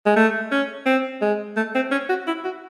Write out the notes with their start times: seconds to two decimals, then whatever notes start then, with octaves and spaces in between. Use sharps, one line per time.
0.06 G#3
0.16 A3
0.52 C#4
0.86 C4
1.22 G#3
1.57 A3
1.75 C4
1.91 C#4
2.09 F#4
2.27 E4
2.45 F#4